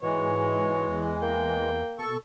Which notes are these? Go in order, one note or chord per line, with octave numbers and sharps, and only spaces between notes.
G#2 B2 E3 G#3 C#5
E2
A#3 G5
B2 A4 C#6